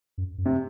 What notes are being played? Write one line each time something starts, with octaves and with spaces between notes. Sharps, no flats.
F#2
F#2
C3